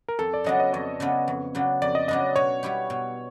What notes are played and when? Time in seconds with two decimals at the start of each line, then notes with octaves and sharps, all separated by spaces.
0.08 A#4
0.19 F2 A4
0.34 D5
0.44 C#3 F#3 B3 D4 D#5
0.60 D#5
0.73 F2 C#5
1.00 C#3 F#3 B3 D4
1.28 F2
1.55 C#3 F#3 B3 D4
1.82 F2 D5
1.95 D#5
2.08 C#3 F#3 B3 D4 D#5
2.36 B2 C#5
2.63 G3 B3 E4 G4
2.90 B2